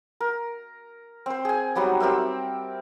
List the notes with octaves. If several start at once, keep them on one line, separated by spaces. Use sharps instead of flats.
A#4
C4 C5
G#4 G#5
F#3 G3 B3 D#4
C4 G4 A#4 E5